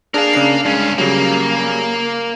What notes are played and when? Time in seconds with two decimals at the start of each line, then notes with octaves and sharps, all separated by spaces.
0.14 D4 G#4 A#4 F5 A5
0.33 C#3 D4 C7
0.65 G2 G#3 C#4 D4
0.98 C#3 F#3 G3 A#3